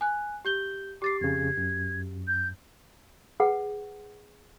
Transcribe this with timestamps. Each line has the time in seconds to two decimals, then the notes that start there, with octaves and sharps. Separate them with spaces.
0.01 G#5 F#6
0.45 G4 G6 G7
1.02 G4 D6 A6 C7
1.21 F2 C#3 G#6
1.57 F#2
2.27 G6
3.40 G#4 B4 F#5